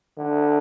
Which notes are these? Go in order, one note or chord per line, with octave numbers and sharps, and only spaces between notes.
D3